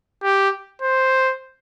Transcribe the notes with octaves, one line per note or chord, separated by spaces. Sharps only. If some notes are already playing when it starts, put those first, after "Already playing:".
G4
C5